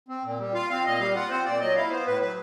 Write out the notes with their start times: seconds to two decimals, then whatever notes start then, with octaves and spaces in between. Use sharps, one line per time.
0.09 C4
0.24 A#2
0.39 G3
0.54 F4 F5
0.70 C4 F5
0.85 A#2 D#5
0.99 G3 F5
1.15 F4 F#5
1.30 C4 C5
1.45 A#2 D5
1.60 F#3 D#5
1.76 E4 F5
1.91 B3 C5
2.07 A2 B4
2.21 F#3 B4